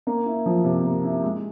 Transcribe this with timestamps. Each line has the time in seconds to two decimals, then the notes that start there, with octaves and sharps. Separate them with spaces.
0.07 A#3
0.26 E4
0.46 F3
0.64 C3
0.85 A#3
1.04 E4
1.23 G#3